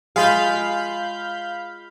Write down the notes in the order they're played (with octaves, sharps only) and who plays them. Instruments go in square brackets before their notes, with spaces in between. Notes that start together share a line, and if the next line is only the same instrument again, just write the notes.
[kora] G#3 F4 [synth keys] F5 B5 G6